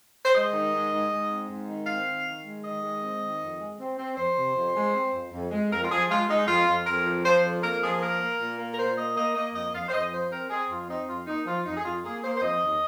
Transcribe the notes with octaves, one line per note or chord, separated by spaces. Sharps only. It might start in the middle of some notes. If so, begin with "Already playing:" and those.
C5
G#3 D#5
D#3
G#2
G#2
G#2
C4
G#2
D#3
C4 F5
D#3
D#3
G#3
D#3 D#5
G#3
C4
D#3
F2
G#3
C4
C4
F2 C5
C3
F2
G#3
C4
F2
F2
G#3
F2 A#4
F4
F3 G#4
G#3 F4
G#3 D#4
F2 F4
F2
F2 A#4
F3
F3 C5
F2
A#3 A#4
F3 G#4
A#3 A#4
A#3
A#2
A#3
A#4
A#2 C5
A#3 D#5
A#3 D#5
A#3 D#5
F2 D#5
F2 F5
C5
F2 D#5
F3 C5
C4 A#4
C4 G#4
F2 F4
C4 D#4
F2 F4
A#3 D#4
F3 F4
F2 D#4
G#4
F2 F4
A#3 G#4
A#3 C5
C5
F2 D#5
D#2